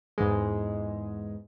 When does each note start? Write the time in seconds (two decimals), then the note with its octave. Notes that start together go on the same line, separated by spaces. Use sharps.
0.18 E2 G#2 E3 G#3